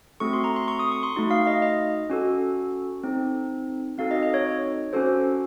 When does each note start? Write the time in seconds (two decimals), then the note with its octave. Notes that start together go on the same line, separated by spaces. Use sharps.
0.20 A3 C4 F#4 A4 C#6
0.33 C6
0.44 A#5
0.56 C6
0.68 C#6
0.79 D#6
0.92 C#6
1.03 C6
1.16 A3 D#4 F#4
1.31 F5
1.47 D#5
1.62 D#5
2.10 C#4 F#4 A4
3.04 C4 D#4 A4
3.98 C4 D#4 F#4 A4 F5
4.11 D#5
4.23 D#5
4.34 C#5
4.93 C#4 F#4 A4 C5